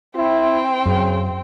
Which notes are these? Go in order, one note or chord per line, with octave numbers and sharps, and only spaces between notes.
C4 E4 G5
F#2 C#3